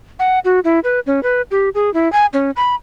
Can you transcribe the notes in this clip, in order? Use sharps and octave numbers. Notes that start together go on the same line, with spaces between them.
F#5
F#4
E4
B4
C#4
B4
G4
G#4
E4
G#5
C#4
B5